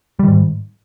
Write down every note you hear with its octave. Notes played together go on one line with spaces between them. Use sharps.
G#2 D#3 G3